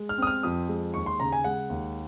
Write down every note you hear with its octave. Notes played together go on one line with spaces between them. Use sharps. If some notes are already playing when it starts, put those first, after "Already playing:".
Already playing: G#3
F6
C4 D#6
F6
F2 D#6
G#3
D#2 C#6
C6
C#3 A#5
G#5
G#3 F#5
D#2